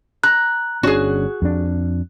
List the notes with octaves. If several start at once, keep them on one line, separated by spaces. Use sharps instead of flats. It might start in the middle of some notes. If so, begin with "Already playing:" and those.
A#5 F#6
G1 C#4 D4 F#4 G#4
F2 D4